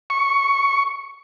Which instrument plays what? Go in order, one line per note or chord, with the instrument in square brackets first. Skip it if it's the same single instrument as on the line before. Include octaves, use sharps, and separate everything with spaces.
[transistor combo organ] C#6